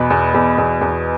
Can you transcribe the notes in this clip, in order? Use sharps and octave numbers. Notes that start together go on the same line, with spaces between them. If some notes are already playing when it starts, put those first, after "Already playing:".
Already playing: E2 B2 B4
E2
E2
E2
E2